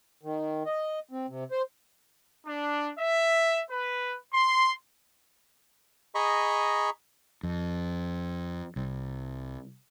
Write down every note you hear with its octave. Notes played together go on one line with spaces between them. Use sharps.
D#3
D#5
C4
C3
C5
D4
E5
B4
C6
G#4 D#5 A#5 B5 C#6
F2
C2